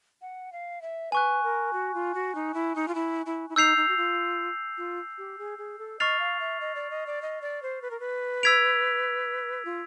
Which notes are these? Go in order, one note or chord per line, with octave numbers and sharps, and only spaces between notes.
F#5
F5
E5
B4 G#5 C#6 F#6
A#4
F#4
F4
F#4
D#4
E4
D#4
F4
E4
E4
E4
D#4 E6 G6 C7 F7
D#4
F#4
F4
F4
G4
G#4
G#4
A4
D#5 C#6 F6 A6 C7 F7
F5
E5
D#5
D5
D#5
D5
D#5
D5
C5
B4
A#4
B4
E6 G#6 B6 D7 F7
F4